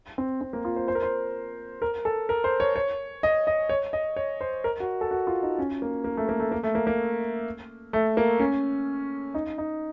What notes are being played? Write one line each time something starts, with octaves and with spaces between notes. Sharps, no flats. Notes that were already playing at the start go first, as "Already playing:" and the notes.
C4
C4
A#3
F4
C5
C5
A#4
C5
A#4
A4
A#4
C5
C#5
C#5
D#5
D#5
C#5
D#5
C#5
C5
A#4
F#4
A4
F#4
F4
D#4
C#4
A#3
A#3
A3
A#3
A3
A#3
A3
A#3
A#3
A3
A#3
C#4
D#4
D#4